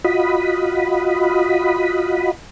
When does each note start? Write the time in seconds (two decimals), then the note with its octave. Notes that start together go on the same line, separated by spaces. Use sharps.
0.05 F4 F#4 D#5 B5